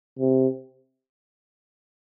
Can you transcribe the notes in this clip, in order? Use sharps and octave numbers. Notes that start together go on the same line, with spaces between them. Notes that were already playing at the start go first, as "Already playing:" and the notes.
C3